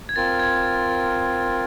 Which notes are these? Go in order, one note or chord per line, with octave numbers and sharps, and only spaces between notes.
G#6
C4 F4 A#4 A6
G#6
G#6